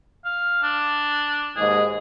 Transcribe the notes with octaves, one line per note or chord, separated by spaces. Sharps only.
F5
D4
D#2 G#2 G#4 D#5